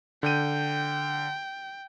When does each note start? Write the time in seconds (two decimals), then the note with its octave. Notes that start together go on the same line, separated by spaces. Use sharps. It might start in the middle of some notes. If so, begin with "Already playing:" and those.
0.23 D3 G5 G6 D#7